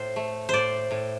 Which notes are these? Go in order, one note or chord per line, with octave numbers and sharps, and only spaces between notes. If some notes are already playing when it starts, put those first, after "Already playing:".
Already playing: A2 C5
A3
A2 C5 D5
A2